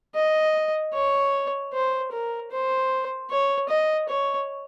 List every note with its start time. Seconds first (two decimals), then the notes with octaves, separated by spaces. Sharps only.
0.15 D#5
0.94 C#5
1.73 C5
2.12 A#4
2.51 C5
3.31 C#5
3.69 D#5
4.09 C#5